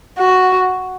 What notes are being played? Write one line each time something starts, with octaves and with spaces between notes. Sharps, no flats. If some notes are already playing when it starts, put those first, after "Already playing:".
F#4